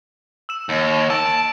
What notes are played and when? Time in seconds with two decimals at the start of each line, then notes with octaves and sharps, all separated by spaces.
0.49 E6 E7
0.69 D#2
1.10 A5 E6 D7